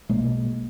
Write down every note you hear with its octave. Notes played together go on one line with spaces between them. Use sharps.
B1 B2 G#3 A#3